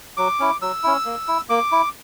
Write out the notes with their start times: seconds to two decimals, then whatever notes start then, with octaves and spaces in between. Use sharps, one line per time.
0.17 F#3 D6
0.40 C#4 E4
0.62 F#3 E6
0.83 C#4 E4
1.05 A#3
1.28 E4
1.49 A#3 D6
1.72 E4